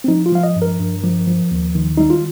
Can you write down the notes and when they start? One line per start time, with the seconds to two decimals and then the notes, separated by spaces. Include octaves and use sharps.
0.04 C4
0.08 F3 D#4
0.26 F4
0.32 F3 F5
0.43 D#5
0.56 G2
0.62 A#4
0.80 G2
1.04 F3
1.27 F3
1.51 D#2
1.75 D#3
1.97 G3 D#4
2.10 F4